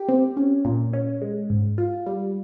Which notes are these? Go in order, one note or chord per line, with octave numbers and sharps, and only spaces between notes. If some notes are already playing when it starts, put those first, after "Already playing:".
Already playing: G4
C4
C#4
A#2
C#4
G#3
G#2
F4
G3